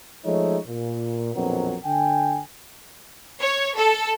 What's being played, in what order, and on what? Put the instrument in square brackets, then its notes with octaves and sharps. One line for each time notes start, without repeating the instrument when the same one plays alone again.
[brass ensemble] F3 G#3 A3 D#4 C#5
A#2
A#1 F2 B2 F#3 C4 A#4
D3 G5 G#5
[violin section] C#5
A4